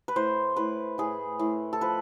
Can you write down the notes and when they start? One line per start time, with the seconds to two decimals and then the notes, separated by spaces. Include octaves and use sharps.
0.08 B4
0.16 A2 C5
0.56 A2 B4
0.98 A2 G#4
1.39 A2
1.73 A4
1.81 F3 B4